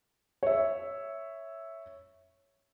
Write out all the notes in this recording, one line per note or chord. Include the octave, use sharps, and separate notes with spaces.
C#5 E5